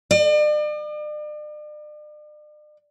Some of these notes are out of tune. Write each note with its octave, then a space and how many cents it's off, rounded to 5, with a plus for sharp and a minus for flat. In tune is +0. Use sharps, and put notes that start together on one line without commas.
D5 +40